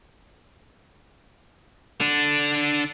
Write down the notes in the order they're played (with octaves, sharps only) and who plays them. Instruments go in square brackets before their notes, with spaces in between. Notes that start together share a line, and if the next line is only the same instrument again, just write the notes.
[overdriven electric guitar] D3 D4